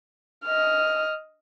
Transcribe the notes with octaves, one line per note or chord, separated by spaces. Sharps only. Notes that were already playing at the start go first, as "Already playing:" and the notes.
D#5 F6